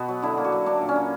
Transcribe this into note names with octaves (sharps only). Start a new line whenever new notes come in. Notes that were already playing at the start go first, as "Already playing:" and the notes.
Already playing: B2 B3 F#4
F#3
D3 E4
A#3
F#4
F#3
A#3 D4
A#2
C#4
A#3